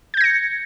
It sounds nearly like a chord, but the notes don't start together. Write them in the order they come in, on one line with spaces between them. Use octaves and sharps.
G6 G#6 A#6 C#7